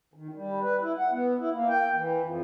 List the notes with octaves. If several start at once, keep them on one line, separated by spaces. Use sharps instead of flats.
D#3
G3
B4
E4
F#5
B3
E4
A#3
G5
E3
F2